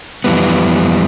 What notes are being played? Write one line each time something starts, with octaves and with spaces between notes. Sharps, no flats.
F2 E3 G3 B3